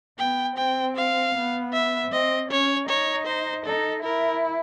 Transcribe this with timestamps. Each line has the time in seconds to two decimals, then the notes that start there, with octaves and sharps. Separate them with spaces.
0.19 B3 G5
0.57 C4 G5
0.96 F5
1.35 B3
1.73 E5
2.11 C4 D#5
2.50 C#4 C#5
2.88 D#4 C#5
3.27 C5
3.66 D#4 A4
4.03 E4 A#4